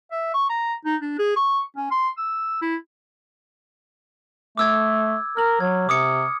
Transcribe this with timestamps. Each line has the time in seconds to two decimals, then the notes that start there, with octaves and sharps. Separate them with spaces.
0.11 E5
0.34 C#6
0.50 A#5
0.85 D#4
1.01 D4
1.19 G#4
1.36 C#6
1.76 C#4
1.91 C6
2.17 E6
2.62 E4
4.58 A3 D6 E6 G#6
5.37 A#4 F6 F#7
5.60 F#3 G#6
5.89 C3 D6 D#6 C#7